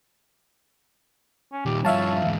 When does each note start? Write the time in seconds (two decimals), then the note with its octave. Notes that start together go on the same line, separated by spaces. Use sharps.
1.52 C#4
1.66 A#2 D#3 G4
1.85 G2 F3 C#5 E5 F5 A5
2.23 E2 G#2